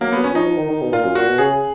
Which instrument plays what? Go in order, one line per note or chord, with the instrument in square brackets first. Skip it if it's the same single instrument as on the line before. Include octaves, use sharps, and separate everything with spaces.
[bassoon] F#3 [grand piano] A#3
[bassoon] F#3 [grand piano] B3
[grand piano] C#4
[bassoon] F3 [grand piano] D#4
[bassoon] F3
D#3
D#3
B2
[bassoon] A#2 [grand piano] F4
[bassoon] F#2
[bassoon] A#2 [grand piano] F#4
[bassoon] B2
[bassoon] C#3 [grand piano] G#4